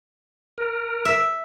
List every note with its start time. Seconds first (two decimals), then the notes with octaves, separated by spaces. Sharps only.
0.58 A#4
1.05 E5